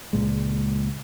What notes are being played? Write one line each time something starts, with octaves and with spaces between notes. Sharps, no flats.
C#2 A#2 G#3